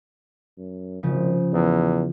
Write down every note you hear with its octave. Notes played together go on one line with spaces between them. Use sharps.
F#2
G#1 C#3 F3
E2